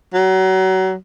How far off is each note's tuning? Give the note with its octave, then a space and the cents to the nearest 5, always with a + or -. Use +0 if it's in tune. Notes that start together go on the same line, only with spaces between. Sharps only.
F#3 +30